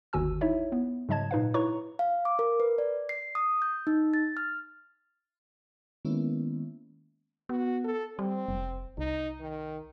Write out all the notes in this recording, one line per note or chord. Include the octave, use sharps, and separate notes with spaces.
G1 D#2 D#3 F#4 G#5 E6
D#4 E4 C#5 E5
B3
G#2 C#3 F#3 D#5 A5 G#6
A#2 D#4 B4 F5
E4 B4 C#5 A#5 C#6
F5
D6
A#4
B4
D5
C7
D#6
G6
D#4
A6
F6
D#3 G#3 A#3 B3 C#4 E4
B3 F#4
A4
G3 C4
F1
C2 D#4
D#3